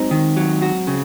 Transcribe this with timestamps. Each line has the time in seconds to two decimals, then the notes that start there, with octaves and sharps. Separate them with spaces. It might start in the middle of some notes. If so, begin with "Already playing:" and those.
Already playing: F#3 G#3 C4 D#4
0.11 D#3
0.37 F#3
0.62 F#4
0.87 C#3